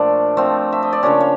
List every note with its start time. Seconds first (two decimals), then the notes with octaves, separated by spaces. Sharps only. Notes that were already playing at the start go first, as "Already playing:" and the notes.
Already playing: A#2 F3 A3 D4 D5
0.37 F3 A3 C4
0.72 E5
0.83 D#5
0.93 D5
1.03 C#3 F3 A#3 C#4 D4 C#5
1.21 C#5